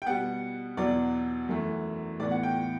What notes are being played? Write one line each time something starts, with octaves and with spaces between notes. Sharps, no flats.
G5
B2 G3 B3 F#5
E2 B2 F#3 D5
F#2 E3 A3
A2 E3 B3 D5
F#5
G5